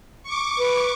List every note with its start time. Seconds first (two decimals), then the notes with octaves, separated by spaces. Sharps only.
0.23 C#6 D6
0.59 B4